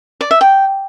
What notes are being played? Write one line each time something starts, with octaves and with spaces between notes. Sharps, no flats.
D5
E5
G5